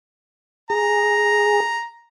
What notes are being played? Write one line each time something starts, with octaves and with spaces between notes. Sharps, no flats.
G#4 A#5